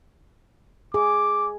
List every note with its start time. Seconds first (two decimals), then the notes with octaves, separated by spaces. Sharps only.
0.94 G#4 D6